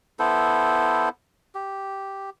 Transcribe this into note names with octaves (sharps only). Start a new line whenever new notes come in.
B3 E4 A4 C5
G4